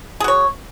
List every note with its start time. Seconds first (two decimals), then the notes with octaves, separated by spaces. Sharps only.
0.20 G#4
0.24 F#4
0.28 C#5